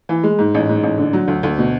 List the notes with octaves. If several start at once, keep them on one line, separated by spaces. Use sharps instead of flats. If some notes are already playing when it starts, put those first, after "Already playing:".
E3
G#3
G#2
A1
G#2
A1
D3
F#3
D2
D2
B2